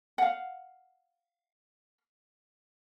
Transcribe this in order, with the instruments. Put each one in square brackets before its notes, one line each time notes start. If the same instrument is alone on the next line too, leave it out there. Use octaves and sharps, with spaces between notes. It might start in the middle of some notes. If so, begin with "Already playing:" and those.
[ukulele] F5 F#5